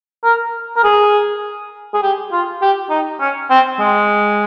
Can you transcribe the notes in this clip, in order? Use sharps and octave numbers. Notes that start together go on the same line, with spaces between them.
A#4
A#4
G#4
G#4
G4
F4
G4
D#4
C#4
C4
G#3